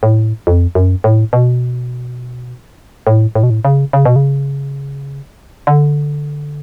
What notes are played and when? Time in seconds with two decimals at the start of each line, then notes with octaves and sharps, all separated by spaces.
0.03 A2
0.47 F2
0.75 F#2
1.04 A2
1.33 B2
3.07 A2
3.35 A2
3.43 B2
3.50 A2
3.65 C#3
3.93 C#3
4.05 B2
4.16 C#3
5.67 D3